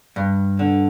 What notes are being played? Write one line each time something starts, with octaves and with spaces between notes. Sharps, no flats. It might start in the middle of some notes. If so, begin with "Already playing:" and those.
G2
D3